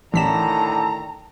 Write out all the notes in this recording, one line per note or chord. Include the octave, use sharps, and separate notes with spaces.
A1 A2 D3 D#3 A5 A#5 B6 E7